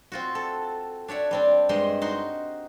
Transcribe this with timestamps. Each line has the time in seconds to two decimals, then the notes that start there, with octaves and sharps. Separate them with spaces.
0.12 C4 F4 F#4
0.35 A4
1.08 D4 C#5 E5 F#5
1.31 G3 C4 D4
1.69 G2 G#3 C5 D#5 C6
2.02 D#4 F#4 C6